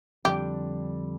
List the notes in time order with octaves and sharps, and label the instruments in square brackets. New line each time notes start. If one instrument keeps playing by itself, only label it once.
[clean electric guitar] F2 D3 G3 D4 [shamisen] G4